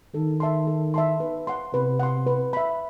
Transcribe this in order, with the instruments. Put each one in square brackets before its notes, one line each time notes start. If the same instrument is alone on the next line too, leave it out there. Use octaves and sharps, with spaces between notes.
[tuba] D#3 [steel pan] A4
[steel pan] E5 A5 C6
A4
E5 A5 C6
B4
F#5 C6
[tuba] C3 [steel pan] B4
[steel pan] F#5 C6
B4
E5 B5